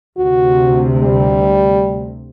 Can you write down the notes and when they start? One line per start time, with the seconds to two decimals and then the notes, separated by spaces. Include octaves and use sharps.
0.17 D2 C3 F#4
1.03 G3